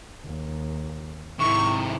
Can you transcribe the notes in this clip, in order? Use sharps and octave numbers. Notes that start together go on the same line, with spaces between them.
D#2
G#2 C3 D#3 E4 C#6